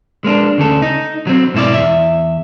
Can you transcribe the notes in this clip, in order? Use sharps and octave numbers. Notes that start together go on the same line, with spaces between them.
G#3 A#3 C#4 D4
D2 C#3 A4
D#4
F#3 C4
G#2 B2 E4 G4 D5
E2 E5